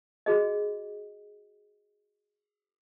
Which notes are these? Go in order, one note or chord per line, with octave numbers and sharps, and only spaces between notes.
F#4 G#4 D#5